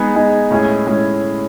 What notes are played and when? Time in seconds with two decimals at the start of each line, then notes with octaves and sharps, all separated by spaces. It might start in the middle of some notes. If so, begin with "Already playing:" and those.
Already playing: G#3 B3 D#4 G#4
0.16 G#3 B3 D#4 G#4
0.50 A2 G#3 C#4 E4 G#4
0.87 A2 G#3 C#4 E4 G#4